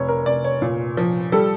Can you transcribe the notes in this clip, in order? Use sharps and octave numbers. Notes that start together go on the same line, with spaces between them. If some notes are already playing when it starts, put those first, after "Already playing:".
Already playing: F1 C#5
A#4
F1 D5
C#5
A#2
F3
G3 A4